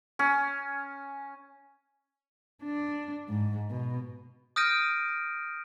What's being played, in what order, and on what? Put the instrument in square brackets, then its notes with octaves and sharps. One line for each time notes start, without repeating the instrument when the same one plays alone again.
[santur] C#4
[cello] D4
G#2
B2
[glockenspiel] D#6 F6 G6 A#6 D7 D#7